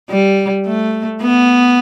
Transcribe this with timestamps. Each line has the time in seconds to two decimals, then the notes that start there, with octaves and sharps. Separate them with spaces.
0.10 G3
0.66 A3
1.22 B3